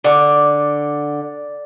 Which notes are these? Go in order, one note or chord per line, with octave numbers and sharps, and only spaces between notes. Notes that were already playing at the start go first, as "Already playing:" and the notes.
D3 D5 D6